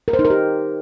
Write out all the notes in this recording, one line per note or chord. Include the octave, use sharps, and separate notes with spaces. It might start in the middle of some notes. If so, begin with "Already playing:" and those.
A#4
C5
D#4
A#4
G4